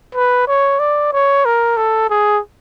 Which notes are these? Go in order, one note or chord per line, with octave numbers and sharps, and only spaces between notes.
B4
C#5
D5
C#5
A#4
A4
G#4